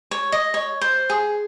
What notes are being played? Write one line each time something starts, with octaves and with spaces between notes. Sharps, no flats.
C#5
D#5
C#5
C5
G#4